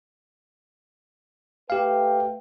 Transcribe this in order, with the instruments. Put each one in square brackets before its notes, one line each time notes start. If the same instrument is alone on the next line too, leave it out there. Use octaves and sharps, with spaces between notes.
[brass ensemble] A3 B4 G5 [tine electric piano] G4 F5